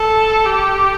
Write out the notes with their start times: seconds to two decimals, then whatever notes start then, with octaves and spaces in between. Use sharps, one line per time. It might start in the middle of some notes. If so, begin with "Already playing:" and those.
Already playing: A4
0.46 G4